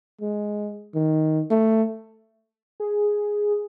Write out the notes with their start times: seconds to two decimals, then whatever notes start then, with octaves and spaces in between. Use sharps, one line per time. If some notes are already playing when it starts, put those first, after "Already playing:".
0.21 G#3
0.95 D#3
1.51 A3
2.80 G#4